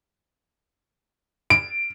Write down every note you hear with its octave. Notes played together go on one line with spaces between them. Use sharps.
D7